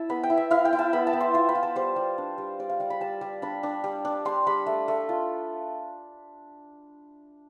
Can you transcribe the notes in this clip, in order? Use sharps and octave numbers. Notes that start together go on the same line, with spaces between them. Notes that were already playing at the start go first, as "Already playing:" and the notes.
Already playing: E4 A5
B3 B5
G5
E4
E5
E4 F5
G5
E4
A5
B3 B5
A5
B3
C6
F4 C6
B5
F4
A5
G3 C5
G3
D4
G3
G3 D5
F5
G3 F5
B5
G3 A5
G3
D4 B5
D4
G3
D4
G3 C6
G3 B5
A3
A3
F4